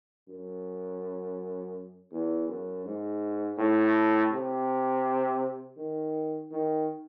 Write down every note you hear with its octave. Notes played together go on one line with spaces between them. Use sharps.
F#2
E2
F#2
G#2
A2
C3
D#3
D#3